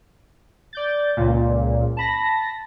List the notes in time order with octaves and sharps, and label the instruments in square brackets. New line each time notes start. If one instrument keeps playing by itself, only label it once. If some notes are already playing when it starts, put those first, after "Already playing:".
[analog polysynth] D5 G6 A6
C#2 A#2
A5 B5 A#6